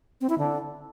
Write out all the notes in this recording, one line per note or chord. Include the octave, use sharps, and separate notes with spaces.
C4
E4
D3